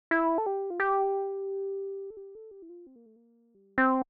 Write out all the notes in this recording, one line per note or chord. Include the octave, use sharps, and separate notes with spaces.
E4
A4
G4
F4
G4
A4
G4
A4
G4
E4
F4
C4
A#3
A3
A#3
G3
C4